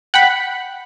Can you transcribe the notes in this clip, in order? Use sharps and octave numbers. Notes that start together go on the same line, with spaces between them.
F#5 G5 B5